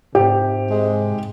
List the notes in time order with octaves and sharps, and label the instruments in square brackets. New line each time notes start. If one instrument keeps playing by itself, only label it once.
[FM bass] G#2 [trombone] C3 [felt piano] G4
[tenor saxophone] G#3